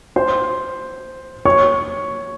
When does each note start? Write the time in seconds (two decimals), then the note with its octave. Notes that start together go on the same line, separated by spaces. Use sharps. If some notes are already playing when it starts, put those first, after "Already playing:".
0.16 C5 C6
1.45 C#5 C#6